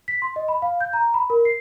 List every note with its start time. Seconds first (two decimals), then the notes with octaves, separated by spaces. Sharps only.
0.08 B6
0.22 C6
0.36 D#5
0.48 B5
0.62 F5
0.81 G6
0.93 A#5
1.14 B5
1.30 A#4
1.45 C7